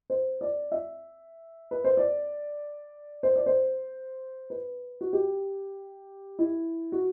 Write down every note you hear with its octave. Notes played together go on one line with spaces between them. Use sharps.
C5
D5
E5
B4
C5
D5
C5
D5
C5
B4
F#4
G4
E4
F#4